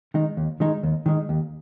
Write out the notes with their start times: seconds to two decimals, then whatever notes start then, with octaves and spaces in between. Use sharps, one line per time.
0.14 D#3 G#3 D#4
0.37 D#2
0.60 D#3 G#3 D#4
0.83 D#2
1.06 D#3 G#3 D#4
1.29 D#2